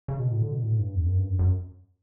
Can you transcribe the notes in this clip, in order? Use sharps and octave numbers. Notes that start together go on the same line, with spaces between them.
C#3
B2
A2
D3
B2
A2
G2
E2
F#2
G2
F#2
F#2